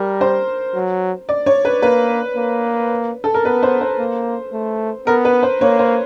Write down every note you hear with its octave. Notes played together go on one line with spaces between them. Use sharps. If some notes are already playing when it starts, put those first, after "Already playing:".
Already playing: G3 A#4
C5
F#3
D5
C#5
B4
A#3 B4
A#3
A4
A#4
B3 B4
C5
C5
A#3
A3
B3 A#4
B4
C5
A#3 C#5
C5